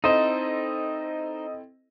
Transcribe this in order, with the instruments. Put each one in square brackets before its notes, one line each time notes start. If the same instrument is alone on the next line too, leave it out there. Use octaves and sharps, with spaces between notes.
[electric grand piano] C4 E4 A4 [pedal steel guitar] D#4 C5 [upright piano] D#5